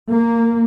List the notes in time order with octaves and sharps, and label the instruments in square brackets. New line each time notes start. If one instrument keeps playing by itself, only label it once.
[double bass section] A#3